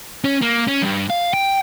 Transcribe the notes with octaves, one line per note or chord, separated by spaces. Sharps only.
C#4
A#3
C#4
G2
F5
G5